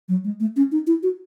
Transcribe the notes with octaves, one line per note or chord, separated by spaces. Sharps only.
F#3
G#3
A3
C#4
D#4
E4
F#4